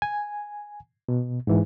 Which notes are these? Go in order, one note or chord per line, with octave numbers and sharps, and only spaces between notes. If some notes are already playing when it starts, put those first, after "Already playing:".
G#5
B2
G#2 E3